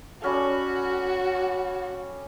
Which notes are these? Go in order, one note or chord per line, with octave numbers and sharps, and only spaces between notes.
G3 C#4 F#4 A4